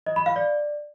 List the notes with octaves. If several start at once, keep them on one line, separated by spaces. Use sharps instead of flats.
D#5
B5
F5
D5